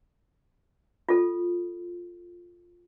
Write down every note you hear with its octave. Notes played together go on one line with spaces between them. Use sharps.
F4 A4